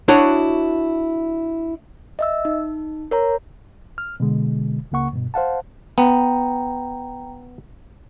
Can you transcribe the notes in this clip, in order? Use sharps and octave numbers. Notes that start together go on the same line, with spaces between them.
D4 E4 F#4 C#5 D#5
D#5 E5 E6
D#4
A#4 C#5 A#5
F6
B2 D3 G#3
C#2 C#3 A#3 F#5 C#6
G2 B2
C5 F5 F#5 A5
B3 G5 A#5